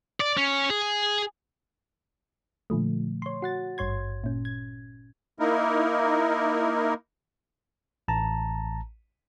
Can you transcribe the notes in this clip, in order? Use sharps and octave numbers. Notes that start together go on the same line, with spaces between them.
D5
C#4
G#4
A#2 D3 F3 A3
C#5 C6
F#4 F#5 A6
G#1 G2 C#5 C6 G#6
A#2 C#4
G#6
A#3 D#4 E4 A#4
A1 A5 A#5